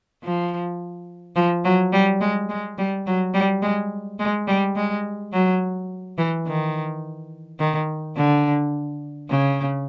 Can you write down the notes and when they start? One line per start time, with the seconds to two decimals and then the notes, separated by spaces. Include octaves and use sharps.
0.23 F3
1.36 F3
1.65 F#3
1.93 G3
2.21 G#3
2.49 G#3
2.78 G3
3.07 F#3
3.34 G3
3.62 G#3
4.19 G#3
4.47 G3
4.76 G#3
5.33 F#3
6.18 E3
6.46 D#3
7.59 D#3
8.16 D3
9.30 C#3